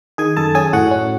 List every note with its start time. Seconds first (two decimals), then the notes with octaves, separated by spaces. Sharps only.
0.18 D#3 G#4 G#5
0.37 F#2 A4 A5
0.55 C#4 G#4 G#5
0.73 A2 F#4 F#5
0.91 C#4